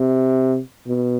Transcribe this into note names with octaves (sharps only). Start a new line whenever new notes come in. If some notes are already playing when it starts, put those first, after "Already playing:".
Already playing: C3
B2